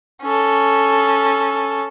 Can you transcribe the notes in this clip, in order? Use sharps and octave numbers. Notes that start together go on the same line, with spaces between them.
C#4 A4